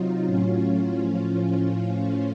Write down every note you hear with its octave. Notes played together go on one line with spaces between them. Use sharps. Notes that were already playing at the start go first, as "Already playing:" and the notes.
Already playing: C3 F#3 D#4 F4
A2 F#3 C#4 F4
A2 F3
A2 F3